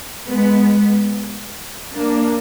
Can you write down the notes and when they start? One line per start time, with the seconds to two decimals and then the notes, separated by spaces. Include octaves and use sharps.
0.28 G#3 B3
1.93 A#3 D4